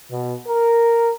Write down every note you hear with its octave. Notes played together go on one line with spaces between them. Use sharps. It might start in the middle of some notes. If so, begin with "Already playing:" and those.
B2
A#4